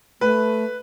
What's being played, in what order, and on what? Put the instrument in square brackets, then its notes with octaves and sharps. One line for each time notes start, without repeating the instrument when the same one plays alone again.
[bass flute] A3 [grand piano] B4